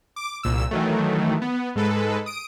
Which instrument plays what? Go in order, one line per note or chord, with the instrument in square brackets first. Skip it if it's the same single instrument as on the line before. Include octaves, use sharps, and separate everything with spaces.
[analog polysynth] D6
C2 A#2 E6
D#3 E3 F#3 A3
B3
G#2 G#3 A4 B4
D#6 D7